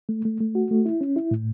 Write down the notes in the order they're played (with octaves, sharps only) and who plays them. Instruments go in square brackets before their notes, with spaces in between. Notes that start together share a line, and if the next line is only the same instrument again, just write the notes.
[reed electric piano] A3
A3
A3
F#4
A3
E4
C#4
E4
A2